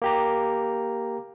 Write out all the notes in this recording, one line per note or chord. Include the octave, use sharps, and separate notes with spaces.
A#3 G4 A#5